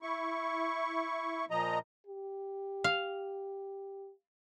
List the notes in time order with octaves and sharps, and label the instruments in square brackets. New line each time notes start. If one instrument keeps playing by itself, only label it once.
[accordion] E4 C#6
A#2 F3 D#5 A#5
[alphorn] G4
[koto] F5